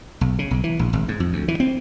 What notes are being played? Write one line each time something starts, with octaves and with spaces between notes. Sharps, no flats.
B1
C#3
B1
E3
A#1
G#1
G#2
F2
D2
E3
C4